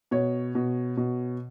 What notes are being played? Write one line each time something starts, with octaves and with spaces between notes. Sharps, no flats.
B2 C#5
B2
B2